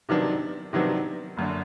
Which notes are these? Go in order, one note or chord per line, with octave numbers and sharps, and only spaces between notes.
C3 D#3 F#3 B3 D4
C3 D#3 F#3 B3 D4
F#1 F#2 D3